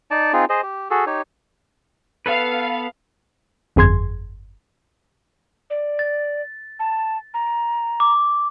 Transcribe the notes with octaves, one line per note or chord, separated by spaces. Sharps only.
D#4 D5 A5
C4 D#4 F4 G#4
G#4 C5 D#5
G4
F#4 G#4 A4
D#4 G4 C#5
B3 A4 B4 F5
G1 F2 G#4 C6 G#6
D5
A6
A5
A#5
D6